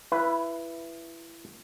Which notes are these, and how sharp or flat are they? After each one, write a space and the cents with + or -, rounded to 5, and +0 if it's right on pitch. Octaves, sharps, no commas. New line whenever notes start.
E4 +20 B4 +0